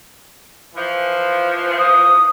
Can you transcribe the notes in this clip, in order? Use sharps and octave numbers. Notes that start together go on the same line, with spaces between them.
E3 F3
D#6